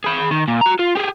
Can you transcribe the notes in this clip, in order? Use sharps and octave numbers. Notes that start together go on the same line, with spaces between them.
G#4 B5
D#3
A#2
F#4 A#5
F4
G4 G#4